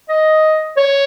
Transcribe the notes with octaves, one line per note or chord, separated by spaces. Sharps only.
D#5
C#5